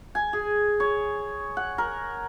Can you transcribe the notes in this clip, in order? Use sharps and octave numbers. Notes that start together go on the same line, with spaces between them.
G#5
G#4
C#5
F#5
A#4